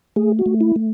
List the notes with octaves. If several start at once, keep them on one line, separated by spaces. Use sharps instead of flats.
A3 G#4
F#4
A3
E4
A3